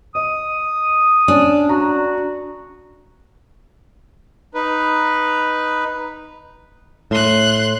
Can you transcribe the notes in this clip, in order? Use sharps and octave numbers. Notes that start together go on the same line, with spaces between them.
D#5 D#6
C#4 D4
F#4 A#5
D#4 B4
A2 C6 F#6